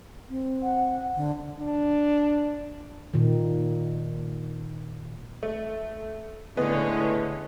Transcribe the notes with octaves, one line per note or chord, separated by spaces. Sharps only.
C4
F#5
D3
D4
A#2 D#3
A3
A2 D3 G#3 B3 C#4